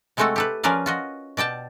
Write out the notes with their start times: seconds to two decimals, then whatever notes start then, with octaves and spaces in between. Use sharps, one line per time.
0.17 C3 G#3 A3 C4 F#4 A4
0.36 G4 A4 B4
0.63 F3 C#4 A#4 B4 D5 F5
0.86 F4 F#4 D#5
1.37 B2 D5 G5 A5